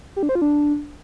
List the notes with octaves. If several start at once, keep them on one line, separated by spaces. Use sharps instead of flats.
G4
D4
C5
F4
D4